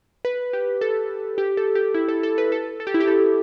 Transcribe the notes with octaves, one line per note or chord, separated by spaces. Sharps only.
B4
G4
A4
G4
A4
G4
E4
A4
A4
B4
A4
A4
G4
E4
G4
A4